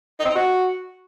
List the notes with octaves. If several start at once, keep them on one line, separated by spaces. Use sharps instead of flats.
D#4
C4
D#4
F#4